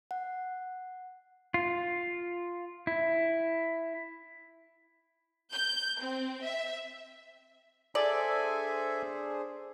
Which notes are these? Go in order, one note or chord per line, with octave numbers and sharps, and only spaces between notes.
F#5
F4
E4
G6
C4
E5
D4 G#4 A4 C5 D5 E5 G#5